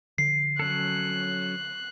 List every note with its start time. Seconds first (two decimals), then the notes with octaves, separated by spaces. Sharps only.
0.18 D3 F3 C7
0.59 F#3 C#4 A4 F#6